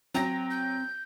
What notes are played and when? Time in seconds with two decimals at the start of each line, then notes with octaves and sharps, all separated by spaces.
0.14 F#3 C4 G5 A#5 A#6
0.50 G6